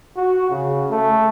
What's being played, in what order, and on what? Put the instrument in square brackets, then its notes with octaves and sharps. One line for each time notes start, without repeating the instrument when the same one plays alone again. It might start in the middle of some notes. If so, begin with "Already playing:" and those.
[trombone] F#4
C#3
A3